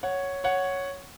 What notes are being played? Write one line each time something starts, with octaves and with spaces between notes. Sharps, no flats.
C#5 F#5
C#5 F#5